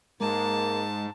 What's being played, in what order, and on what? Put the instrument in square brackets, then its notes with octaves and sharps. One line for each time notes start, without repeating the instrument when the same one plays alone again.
[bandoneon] G#2 [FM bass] G#3 [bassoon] A#3 [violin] A5